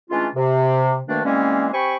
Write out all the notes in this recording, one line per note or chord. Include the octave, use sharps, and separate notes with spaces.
E3 G#3 A3 C#4 D4 F4
C3
D2 B2 D#3 A3 A#3 D4
E3 G3 G#3 A#3 C4 C#4
C4 G4 G5 G#5 B5 C#6